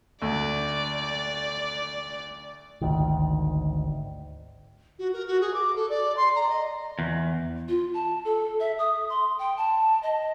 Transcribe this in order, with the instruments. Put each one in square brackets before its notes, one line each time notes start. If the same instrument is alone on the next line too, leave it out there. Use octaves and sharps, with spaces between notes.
[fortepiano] D2 [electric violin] D5
[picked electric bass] G#1 D2 D#3
[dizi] F#4
A#4
F#4
G#4
D6
A4
D5
C6
A#5
D#5
[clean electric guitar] E2
[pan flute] F4
A5
A4
E5
D#6
C6
G5
A5
D#5